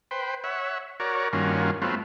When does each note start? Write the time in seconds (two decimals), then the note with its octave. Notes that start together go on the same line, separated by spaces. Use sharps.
0.11 B4 C5 G5
0.44 C#5 E5 F#5
1.00 F#4 A#4 C#5 D5
1.33 G2 D#3 A#3 C#4 F4 F#4
1.82 F#3 A3 B3 C4 F4